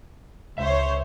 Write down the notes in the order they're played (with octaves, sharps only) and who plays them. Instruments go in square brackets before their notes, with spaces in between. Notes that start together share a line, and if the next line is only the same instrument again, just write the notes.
[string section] C#2 C5 C#5 [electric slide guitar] E5